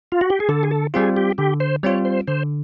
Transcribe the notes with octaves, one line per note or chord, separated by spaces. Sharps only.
F4
F#4
G4
G#4
D3 A4
G#4
A4
G3 C4 F4 G#4
G4
D3 G4
C5
G3 C4 F4 C#5
C5
D3 C5